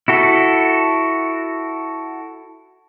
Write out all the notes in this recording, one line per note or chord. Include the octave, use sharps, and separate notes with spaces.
E4 F#4 A4